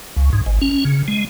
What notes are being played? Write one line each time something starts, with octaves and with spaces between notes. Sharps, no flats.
C#2
G#2
G#1
C#4
C#3
G#3